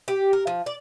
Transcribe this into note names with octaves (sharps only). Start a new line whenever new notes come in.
G4
A#4
F3
D5